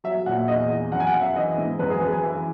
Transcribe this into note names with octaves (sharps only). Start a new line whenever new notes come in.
F#3 E5
A#2 F#5
E2 D#5
E2
F#2 F#5
G#5
F#5
F#2
E5
E3 D#5
G#2
F#2 B4
G#4
F#2 B4
G#5
E3